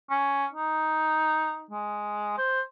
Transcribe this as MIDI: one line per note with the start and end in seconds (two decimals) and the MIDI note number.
0.10 0.46 61
0.53 1.63 63
1.71 2.38 56
2.38 2.61 72